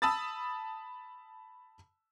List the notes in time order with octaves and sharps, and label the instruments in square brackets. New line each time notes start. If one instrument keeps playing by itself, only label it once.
[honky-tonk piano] A5 B5 D#6 E6 A6